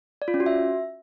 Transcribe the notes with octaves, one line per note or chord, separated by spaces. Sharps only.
D5
F4
C#4
F#4
E5